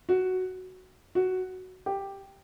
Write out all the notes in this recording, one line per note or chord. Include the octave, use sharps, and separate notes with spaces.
F#4
F#4
G4